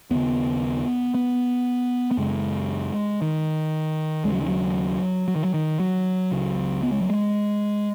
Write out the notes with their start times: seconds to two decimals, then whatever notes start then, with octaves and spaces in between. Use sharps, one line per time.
0.10 D#2 C#3 B3
1.15 B3
2.11 B3
2.17 F#2 C#3 G#3
3.22 D#3
4.24 D#2 G#3
4.28 C#3 F#3
4.41 D#3
4.48 F#3
5.28 F#3
5.36 D#3
5.44 F#3
5.54 D#3
5.80 F#3
6.31 C#2 C#3
6.83 B3
6.92 G#3
7.01 F#3
7.09 G#3